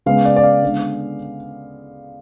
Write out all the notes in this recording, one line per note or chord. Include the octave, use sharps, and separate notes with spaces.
C#3 G#3 B3 F5
D5
D5
F5
D3 G#3 B3